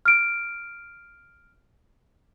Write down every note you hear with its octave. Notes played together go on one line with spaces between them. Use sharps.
F6 D7